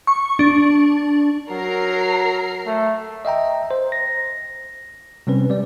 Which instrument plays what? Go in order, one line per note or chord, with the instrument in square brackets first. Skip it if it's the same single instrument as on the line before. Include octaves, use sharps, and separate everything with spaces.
[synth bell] C#6
D4
[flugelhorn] F#3 [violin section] A#4 A#5 C7
[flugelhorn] A3
[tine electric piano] D#5 E5 G5 A#5
C5
A#6
C3 G3 C4 C#4 B4
G3 D5